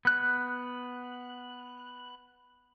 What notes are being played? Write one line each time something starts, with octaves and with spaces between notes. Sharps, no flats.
B3 F#6